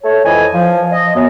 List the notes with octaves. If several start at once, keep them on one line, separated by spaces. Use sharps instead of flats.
A3 A4 C#5
F2 E3 D#5 G#5
F3
D#5
F#2 B3